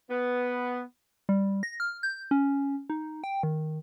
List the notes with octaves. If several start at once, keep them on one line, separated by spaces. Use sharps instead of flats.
B3
G3
A#6
F6
G6
C#4
D#4
G5
D#3